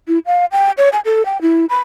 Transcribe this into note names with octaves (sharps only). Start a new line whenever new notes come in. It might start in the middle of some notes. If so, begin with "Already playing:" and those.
E4
F5
G5
C#5
G#5
A4
G5
E4
B5